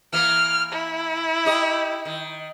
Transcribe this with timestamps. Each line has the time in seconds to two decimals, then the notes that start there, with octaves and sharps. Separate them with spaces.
0.13 E3 A#3 F6
0.72 E4
1.45 D#4 G4 D#5
2.05 D#3